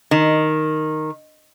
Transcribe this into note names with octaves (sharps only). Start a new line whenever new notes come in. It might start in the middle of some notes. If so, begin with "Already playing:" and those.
D#3